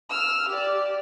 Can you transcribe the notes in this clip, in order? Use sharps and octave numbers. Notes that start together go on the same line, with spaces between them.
E6 F6
G4 D5